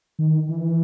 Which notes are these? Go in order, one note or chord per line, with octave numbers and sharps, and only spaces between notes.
D#3
E3